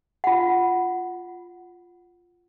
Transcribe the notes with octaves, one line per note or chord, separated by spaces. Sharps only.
F4 F#5